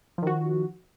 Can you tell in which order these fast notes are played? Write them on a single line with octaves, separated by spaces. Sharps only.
F3 D#3 F#4